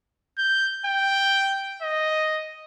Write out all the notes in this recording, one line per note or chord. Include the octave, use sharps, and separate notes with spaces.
G6
G5
D#5